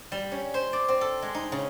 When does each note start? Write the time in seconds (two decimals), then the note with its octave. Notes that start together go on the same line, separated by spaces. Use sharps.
0.12 G3
0.32 C#4
0.54 C5
0.73 D5
0.88 C4
1.01 A4
1.22 G#3
1.35 D#4
1.52 C#3